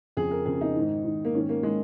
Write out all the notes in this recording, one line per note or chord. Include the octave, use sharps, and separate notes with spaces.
F2 C#3 G#4
A#4
F2 C#3 G#4
D#4
G#2 D#3
G#2 D#3
A#3
G#2 D#3 C#4
A#3
D#3 G#3